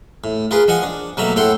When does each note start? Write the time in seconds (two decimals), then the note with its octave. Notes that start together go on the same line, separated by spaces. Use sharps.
0.24 A2
0.51 F4 G#4 A#4 B4
0.68 F3 D#5 F#5 G#5 D#6
0.83 D4
1.17 B2 F#3 A3 A#3 A#5 B5
1.36 A2 A4 C#5 F#5 G5 C6